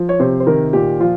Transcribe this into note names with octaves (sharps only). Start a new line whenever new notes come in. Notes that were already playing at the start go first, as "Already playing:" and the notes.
Already playing: F3
C#5
C3 C5
C5
D#3 A#4
A#2 G4
F3 F4